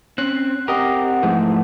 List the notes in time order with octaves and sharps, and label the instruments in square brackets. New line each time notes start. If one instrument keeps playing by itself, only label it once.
[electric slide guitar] C4 C#4 [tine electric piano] F#6
[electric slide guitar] C4 A#4 [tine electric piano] G4 D#5 [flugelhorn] F#5
[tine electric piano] G#2 E3 [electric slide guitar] F3 A3